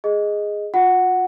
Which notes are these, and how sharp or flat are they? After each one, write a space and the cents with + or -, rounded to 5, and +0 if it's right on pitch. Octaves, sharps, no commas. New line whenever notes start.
G#4 -5 D#5 +0
F4 +40 F#5 +0